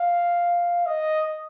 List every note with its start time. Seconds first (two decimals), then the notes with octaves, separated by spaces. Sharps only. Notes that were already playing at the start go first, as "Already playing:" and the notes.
Already playing: F5
0.86 D#5